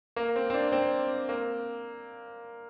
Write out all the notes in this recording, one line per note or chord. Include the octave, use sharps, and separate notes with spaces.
A#3
C4
C4
D4
C4
A#3